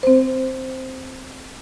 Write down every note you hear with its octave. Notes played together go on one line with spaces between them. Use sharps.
C4 C5